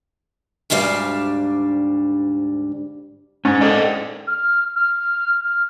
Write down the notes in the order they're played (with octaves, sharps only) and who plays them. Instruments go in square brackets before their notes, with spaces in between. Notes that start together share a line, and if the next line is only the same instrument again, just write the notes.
[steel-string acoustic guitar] D2 G#2 G3 D4 F5
[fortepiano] G#2 [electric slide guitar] C#4
[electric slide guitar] A4 D5 D#5
[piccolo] F6
F6
F6